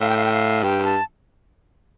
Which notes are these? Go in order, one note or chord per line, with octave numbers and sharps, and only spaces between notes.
A2 F5
G5
F5
G5
F5
G2 G5
A5